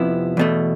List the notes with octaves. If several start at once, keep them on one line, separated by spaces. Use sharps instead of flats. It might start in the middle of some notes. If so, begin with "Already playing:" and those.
Already playing: F2 C3 F3 B3 E4
E2 B2 A3